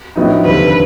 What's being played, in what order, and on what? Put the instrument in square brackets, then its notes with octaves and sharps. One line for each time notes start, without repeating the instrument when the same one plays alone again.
[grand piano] A#1 A2 F#3 B3 D#4
[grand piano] F1 D#2 D3 G3 C4 [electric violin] B4